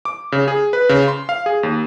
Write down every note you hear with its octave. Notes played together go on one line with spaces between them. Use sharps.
D6
C#3
G#4
B4
C#3
C6
F5
G#4
D#2